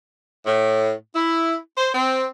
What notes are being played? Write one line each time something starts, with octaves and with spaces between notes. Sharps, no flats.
A2
E4
C5
C4